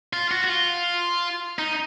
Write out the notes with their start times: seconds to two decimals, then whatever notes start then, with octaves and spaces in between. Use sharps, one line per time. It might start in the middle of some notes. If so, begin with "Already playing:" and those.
0.13 F4
0.32 F#4
0.44 F#4
0.49 F4
1.59 D#4